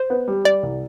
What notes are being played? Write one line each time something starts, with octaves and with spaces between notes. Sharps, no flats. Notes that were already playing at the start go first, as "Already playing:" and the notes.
Already playing: C5
B3
G3
G3 D5
C2